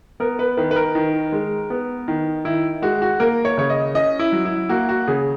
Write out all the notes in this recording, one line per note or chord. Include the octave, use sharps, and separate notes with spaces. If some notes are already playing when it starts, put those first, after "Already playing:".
B3 A#4
B4
D#3 B4
B4
A#4
D#3
G#3
B3
D#3
D#3 E4
G#3 F#4
F#4
A#3 A#4
C#5
C#3 C#5
D#5
C#4 D#5
E4
F#3
E4
A#3 F#4
F#4
C#3 G#4